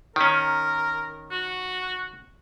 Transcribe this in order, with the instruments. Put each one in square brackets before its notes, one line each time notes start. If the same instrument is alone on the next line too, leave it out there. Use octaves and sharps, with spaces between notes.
[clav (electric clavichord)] D#3 C#4 [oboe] A#4
[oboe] F#4